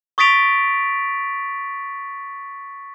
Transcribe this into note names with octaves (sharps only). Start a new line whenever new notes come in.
C#6 D#6 A6 B6 D7 F7